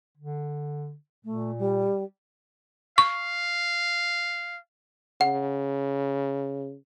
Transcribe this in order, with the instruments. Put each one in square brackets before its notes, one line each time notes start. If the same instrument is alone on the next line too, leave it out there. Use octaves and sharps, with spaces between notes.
[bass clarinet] D3
[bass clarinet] A#2 [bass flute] A3
[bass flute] G3
[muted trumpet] F5 [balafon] C#6
[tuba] C#3 [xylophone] F#5